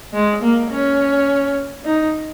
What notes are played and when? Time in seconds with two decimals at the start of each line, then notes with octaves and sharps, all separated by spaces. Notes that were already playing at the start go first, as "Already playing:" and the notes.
0.13 G#3
0.43 A#3
0.71 C#4
1.85 D#4